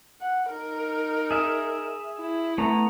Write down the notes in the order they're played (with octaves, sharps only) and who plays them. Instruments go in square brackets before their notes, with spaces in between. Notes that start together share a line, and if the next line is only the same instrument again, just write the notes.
[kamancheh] F#5
D#4 A#4
[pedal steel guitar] G#4 E5
[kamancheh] E4
[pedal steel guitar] A3 B3 A#5